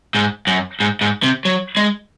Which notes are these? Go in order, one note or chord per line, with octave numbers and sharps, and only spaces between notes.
G#2
F#2
G#2
G#2
C3
F#3
G#3